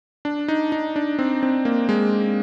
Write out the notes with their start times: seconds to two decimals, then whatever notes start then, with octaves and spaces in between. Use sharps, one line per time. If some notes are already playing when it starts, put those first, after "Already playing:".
0.25 D4
0.48 D#4
0.72 D#4
0.96 D4
1.19 C4
1.43 C4
1.65 A#3
1.89 G#3